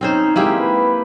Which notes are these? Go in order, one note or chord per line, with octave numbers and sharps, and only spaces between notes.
C4 C#4 D#4 C5
G#3 A#3 E4 G4
B4